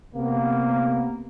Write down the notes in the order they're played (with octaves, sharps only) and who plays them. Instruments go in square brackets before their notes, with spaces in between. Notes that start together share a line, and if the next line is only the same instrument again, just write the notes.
[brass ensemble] C3 A#3 B3